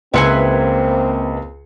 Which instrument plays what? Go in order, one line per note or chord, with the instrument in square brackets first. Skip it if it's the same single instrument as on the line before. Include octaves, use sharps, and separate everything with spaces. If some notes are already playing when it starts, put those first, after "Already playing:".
[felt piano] C#2 C6 C#7 [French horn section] A#3 C4 [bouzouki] E4 B4 G#5